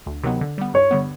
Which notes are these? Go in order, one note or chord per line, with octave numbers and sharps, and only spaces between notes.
D2
C3 D#3 F#3 B3
D3
G3 B3
G2 C#5
D3 G3 B3